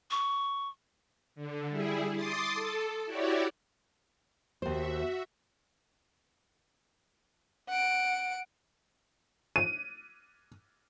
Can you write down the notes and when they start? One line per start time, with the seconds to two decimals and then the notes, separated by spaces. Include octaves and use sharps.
0.11 C#6
1.35 D3
1.69 G3 E4 G#4
2.15 C6 D6 D#6 A6 C7
2.53 A4
3.06 E4 F#4 G4 C#5 D5
4.62 D#2 F#4 C5 E5
7.69 F#5 D7
9.56 D#7